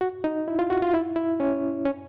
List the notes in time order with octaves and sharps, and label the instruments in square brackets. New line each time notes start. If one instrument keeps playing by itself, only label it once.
[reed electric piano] F#4
D#4
E4
F4
F#4
F4
E4
E4
C#4
C#4